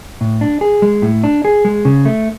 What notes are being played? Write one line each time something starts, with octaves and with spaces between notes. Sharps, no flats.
A2
D4
G#4
G#3
A2
D4
G#4
G#3
C#3
A3